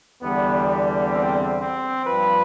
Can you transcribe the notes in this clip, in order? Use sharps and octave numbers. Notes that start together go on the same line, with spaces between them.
E2 D3 G3 B3
C4
C4
G2 F3 B4